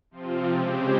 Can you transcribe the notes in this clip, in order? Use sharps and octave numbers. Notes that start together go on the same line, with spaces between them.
C3 F3 C4 F4
C#3 G#3 C4 G4 C5